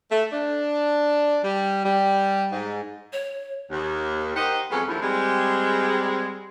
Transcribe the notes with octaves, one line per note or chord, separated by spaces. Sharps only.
A3
D4
G3
G3
G#2
C#5
D#2
D#3 D#4 G4 C5 D#5 F#5
F2 F#3 G#3 B3 C#4
D#2 A2 D3 F3 E4
G3 G#3 C4